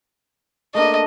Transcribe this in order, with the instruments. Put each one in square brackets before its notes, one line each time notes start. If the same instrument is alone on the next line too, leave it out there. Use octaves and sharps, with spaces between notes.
[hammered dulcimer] A3 A#3 D4 [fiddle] D#5